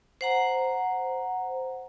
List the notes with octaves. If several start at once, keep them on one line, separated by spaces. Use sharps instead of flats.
C5 F#5 A#5